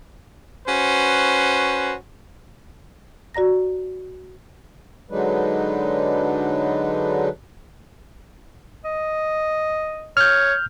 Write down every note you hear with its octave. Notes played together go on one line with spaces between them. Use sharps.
C#4 F#4 B4 C5
F#4 D5 A#5 A#6
D3 F#3 G#3 D4 D#4 B4
D#5
C#5 F6 G6